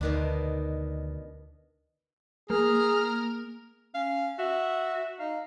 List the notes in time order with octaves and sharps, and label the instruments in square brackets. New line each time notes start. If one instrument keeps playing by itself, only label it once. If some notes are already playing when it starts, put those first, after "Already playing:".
[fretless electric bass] D2 [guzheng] B2 D#3 D4
[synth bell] A#3 [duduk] G#4 [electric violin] A#5 F6
[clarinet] C#4 [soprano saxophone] F5
[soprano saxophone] F#4 [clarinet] E5
[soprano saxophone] D#4 [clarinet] F5